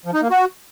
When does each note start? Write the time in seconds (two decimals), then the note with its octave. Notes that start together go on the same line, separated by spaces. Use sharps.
0.06 F3
0.14 D#4
0.22 A#3
0.30 F#4